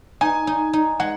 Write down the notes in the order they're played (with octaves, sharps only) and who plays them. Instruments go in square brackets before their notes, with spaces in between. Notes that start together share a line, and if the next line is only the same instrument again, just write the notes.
[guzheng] D#4 [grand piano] G#5
[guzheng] D#4
D#4
[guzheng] G#3 [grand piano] F#5